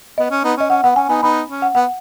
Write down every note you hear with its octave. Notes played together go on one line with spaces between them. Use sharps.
B3 D#5
C#4
B3 D#4
C#4 D#5
C#4 F#5
B3 F#5
C#4 G#5
B3 D#4 G#5
B3 D#4 B5
C#4
F#5
B3 F#5